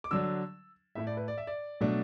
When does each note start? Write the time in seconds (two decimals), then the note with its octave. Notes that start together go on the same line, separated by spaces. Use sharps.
0.04 D6
0.11 D3 F#3 D4 E6
0.95 A2 A3 E4 E5
1.07 D5
1.17 B4
1.28 D5
1.38 E5
1.47 D5
1.81 B2 F#3 A3 D4